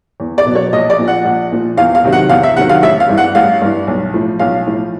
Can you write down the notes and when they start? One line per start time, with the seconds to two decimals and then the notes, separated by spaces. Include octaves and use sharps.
0.20 E2
0.38 D5
0.46 B2 F#3
0.55 C#5
0.73 A#1 D#5
0.90 D5
0.99 A#2 F3
1.08 F#5
1.25 A#1
1.52 A#2 F3
1.77 E2 F5
1.95 F5
2.04 C3 D#3 F#3
2.13 F#5
2.29 E2 F5
2.43 E5
2.56 C3 D#3 F#3 F#5
2.69 F5
2.82 A1 E5
3.00 F5
3.09 G2 E3
3.18 F#5
3.35 A1 F5
3.61 G2 E3
3.87 B1
4.14 A2 F3
4.39 B1 F5
4.67 A2 F3